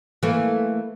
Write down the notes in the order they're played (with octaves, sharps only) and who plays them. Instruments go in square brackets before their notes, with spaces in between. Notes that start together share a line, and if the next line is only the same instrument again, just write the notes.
[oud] E3 A3 A#3